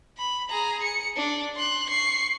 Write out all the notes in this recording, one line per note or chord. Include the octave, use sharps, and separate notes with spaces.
B5
G#4 A#5
C#7
D4
C6 F#6
C#6 C7